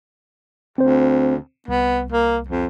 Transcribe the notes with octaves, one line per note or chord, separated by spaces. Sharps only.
D2 C4 C5
C2 B3
A#3
F2